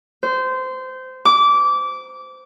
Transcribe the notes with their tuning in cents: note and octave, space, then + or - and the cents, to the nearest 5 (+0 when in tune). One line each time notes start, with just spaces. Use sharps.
C5 -20
D6 -20